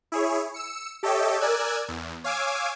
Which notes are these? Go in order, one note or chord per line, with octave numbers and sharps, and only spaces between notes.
E4 G#4 C#5
E6 C#7
G4 A4 C#5 D#5 E5 G5
A#4 D5 G#5 E6 F#6 G#6
E2
C#5 F5 G#5 D6 E6 G#6